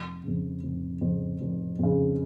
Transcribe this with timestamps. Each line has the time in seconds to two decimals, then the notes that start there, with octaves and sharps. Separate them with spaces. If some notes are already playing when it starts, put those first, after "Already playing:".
Already playing: F1
0.24 F2 C#3
0.63 F1
1.01 F2 C#3
1.41 F1
1.79 F2 C#3